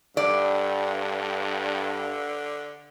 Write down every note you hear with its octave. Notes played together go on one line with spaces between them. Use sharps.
G2 D3 D5